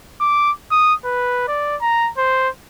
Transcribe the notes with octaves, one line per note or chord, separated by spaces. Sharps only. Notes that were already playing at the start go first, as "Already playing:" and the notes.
D6
D#6
B4
D5
A#5
C5